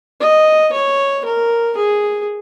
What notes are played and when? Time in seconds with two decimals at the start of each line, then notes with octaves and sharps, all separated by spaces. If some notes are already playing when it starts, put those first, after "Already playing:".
0.20 D#5
0.73 C#5
1.25 A#4
1.77 G#4